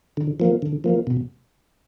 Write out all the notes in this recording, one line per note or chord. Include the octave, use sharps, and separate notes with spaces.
D3
F3 A#3
D3
F3 A#3
B2